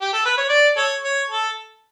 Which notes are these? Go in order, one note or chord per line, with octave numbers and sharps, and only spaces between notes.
G4
A4
B4
C#5
D5
A4 C#5
C#5
A4